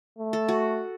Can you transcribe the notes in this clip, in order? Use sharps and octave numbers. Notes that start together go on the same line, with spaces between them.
A3
A4
F#4